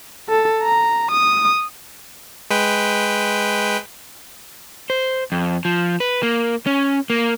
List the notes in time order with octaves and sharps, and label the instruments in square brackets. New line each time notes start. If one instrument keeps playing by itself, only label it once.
[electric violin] A4
A#5
D#6
[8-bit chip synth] G#3 B4 G5
[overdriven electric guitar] C5
F2
F3
B4
A#3
C#4
A#3